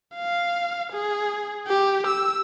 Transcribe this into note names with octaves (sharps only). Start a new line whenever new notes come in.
F5
G#4
G4
E6